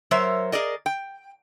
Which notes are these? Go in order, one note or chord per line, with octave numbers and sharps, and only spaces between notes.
F#3 A#4 C5 C#5 E5
G#4 A#4 D5 D#5
G5